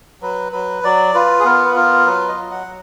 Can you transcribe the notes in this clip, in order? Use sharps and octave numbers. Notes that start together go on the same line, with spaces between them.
F#3 B4
F#3 B4
F#3 D5
F4 B4
G#4
B3 A#4
B4
F4 A#4
F#3 B4
D#5
F#3
F#5
F#3